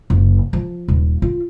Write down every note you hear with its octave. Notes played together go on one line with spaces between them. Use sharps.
F#1
F3
D#1
F4